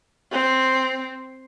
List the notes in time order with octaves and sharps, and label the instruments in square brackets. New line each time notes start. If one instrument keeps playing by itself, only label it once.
[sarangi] C4